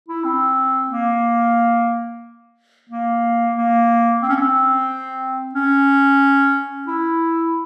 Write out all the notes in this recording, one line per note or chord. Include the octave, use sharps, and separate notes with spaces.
E4
C4
A#3
A#3
A#3
C4
C#4
C4
C#4
E4